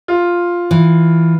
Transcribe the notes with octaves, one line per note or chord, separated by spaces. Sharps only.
F4
E3